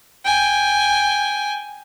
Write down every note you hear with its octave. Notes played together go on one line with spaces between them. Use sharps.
G5 G#5